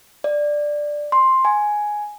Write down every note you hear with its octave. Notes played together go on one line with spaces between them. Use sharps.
D5
C6
G#5